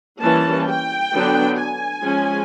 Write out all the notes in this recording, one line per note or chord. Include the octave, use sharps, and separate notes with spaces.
E3 G3 A#3 C#4 A5
G5
D3 F#3 B3 D4
G#5
F3 G#3 C#4